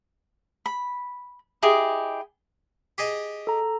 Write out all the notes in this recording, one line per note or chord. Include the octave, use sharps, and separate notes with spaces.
B5
E4 G4 G#4 D#5
G4 G#4 D#5
A4 A#5